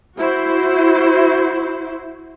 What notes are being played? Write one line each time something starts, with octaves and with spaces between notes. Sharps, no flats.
E4 F#4 C5